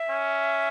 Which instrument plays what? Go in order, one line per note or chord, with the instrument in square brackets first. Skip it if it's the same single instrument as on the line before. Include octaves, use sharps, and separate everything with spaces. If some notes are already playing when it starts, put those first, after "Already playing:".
Already playing: [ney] E5
[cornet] C#4